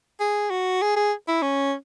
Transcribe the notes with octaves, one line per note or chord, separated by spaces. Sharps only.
G#4
F#4
G#4
G#4
E4
C#4